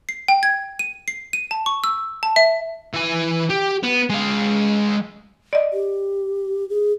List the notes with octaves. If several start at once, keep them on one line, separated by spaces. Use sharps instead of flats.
C7
G5
G#6
D#7
C7
D#7
A5
C#6
E6
A5
E5
E3 G#5
G4
B3
G#3 F5
D5 D#5
G4
G#4